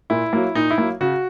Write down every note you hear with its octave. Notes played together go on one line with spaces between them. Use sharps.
A#2 E4
F#3 A#3
A#2 D#4
E4
F#3 A#3
C#3 F#4